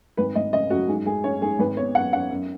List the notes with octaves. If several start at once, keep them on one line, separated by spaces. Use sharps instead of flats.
G#1 B4
G#1 D#5
C#3 D#5
F#2 F#4
G#2 G#4
G#2 G#4
C#4 C#5
G#2 G#4
G#1 B4
B3 C#5
F#2 F#5
F#2 F#5
F#2